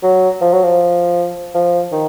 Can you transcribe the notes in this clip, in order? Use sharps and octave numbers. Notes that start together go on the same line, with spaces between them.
F#3
F3
F#3
F3
F3
D#3